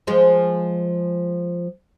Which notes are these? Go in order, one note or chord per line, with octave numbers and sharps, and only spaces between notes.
F3 G#3